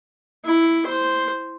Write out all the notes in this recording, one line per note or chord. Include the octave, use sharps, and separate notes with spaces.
E4
C5